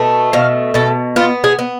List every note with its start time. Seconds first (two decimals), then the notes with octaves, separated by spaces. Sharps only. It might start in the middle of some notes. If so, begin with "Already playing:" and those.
Already playing: B2 A3
0.33 B2 F5
0.74 B2 A4
1.16 B3 F4
1.44 G#4
1.59 B3